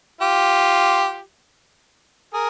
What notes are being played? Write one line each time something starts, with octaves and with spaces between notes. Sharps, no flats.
F4 G4
G#4 A#4